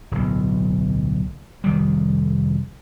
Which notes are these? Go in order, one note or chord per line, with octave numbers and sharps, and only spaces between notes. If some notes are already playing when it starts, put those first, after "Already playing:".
D1 B1
F1 D#3 G3